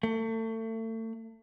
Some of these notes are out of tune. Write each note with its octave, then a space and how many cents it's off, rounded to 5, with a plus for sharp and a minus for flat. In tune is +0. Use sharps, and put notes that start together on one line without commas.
A3 +35